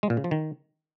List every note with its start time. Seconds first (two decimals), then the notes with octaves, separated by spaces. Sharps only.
0.03 G#3
0.10 A#2
0.17 C#3
0.24 F3
0.31 D#3